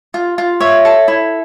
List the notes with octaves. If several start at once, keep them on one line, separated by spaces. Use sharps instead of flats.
F4
F4
C#5 E5
A4
E4